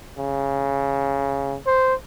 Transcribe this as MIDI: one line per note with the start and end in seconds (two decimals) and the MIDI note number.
0.19 1.56 49
1.67 1.94 72